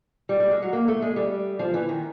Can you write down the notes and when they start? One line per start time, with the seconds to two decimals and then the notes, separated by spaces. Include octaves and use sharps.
0.29 G3
0.40 G3
0.51 G#3
0.62 F#3
0.73 A#3
0.88 A3
1.02 G#3
1.16 G3
1.59 F3
1.74 E3
1.89 D#3